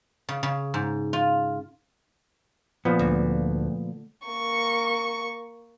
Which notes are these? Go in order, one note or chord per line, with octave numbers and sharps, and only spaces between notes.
C#3
C#3
G#2
F4
A#2 F3 B3
D2
A#3 C#6